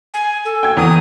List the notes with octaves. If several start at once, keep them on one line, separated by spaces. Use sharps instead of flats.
G#5
A4
G5 G#6
E2 D#6